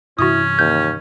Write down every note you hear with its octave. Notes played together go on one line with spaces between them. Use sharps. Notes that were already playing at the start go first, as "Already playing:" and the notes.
G2 C3 E3 C#4 E4 F#4 D#6
D#2 G6